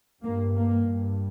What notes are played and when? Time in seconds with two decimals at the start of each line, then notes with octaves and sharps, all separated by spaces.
0.23 G2 A#3
0.56 A#3
0.88 G2